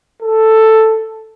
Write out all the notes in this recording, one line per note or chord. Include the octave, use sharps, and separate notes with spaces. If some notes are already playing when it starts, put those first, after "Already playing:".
A4